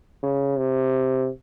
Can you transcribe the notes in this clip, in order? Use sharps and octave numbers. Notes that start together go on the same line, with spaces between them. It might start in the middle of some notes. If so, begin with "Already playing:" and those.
C#3
C3